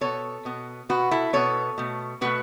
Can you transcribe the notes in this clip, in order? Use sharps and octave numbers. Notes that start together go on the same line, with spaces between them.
B2 B3 A4 C#5
B2 B3
B2 B3 F#4 B4
E4 A4
B2 B3 A4 C#5
B2 A3
B2 A3 F#4 B4